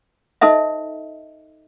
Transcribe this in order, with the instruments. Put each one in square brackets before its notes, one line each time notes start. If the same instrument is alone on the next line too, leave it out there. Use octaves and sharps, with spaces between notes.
[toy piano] D#4 A4 C5 D#5 E5